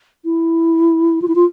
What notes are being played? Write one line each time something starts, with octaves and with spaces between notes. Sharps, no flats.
E4
F4
E4
F4